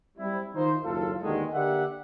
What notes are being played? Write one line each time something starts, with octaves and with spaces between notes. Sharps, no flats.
G3 C4 E4
D#3 D#4 F4 C5
F#1 D#2 F4 A4
D#2 B2 D3 D#3 G#3
D3 A#3 G4 D5 E5 F#5